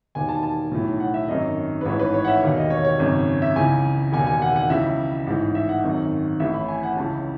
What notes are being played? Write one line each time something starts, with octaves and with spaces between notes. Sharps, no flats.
E1 D#2 D#3 G#5
A5
A5
B1 A2 E3
F#5
E5
G#1 F#2 D#3 D#5
B4
A1 G#2 E3 C#5
B4
C#5
F#5
E5
E1 D#2 D#3
D#5
C#5
C#5
G#1 F#2 C#3
E5
C#2 C#3 E3 G#5
E1 D#2 D#3 G#5
G#5
F#5
F#5
C#2 C#3 E3 E5
A1 G#2 E3
E5
F#5
G#1 F#2 D#3
A1 A2 E3 E5
B5
G#5
F#5
C#2 C#3 E3 A5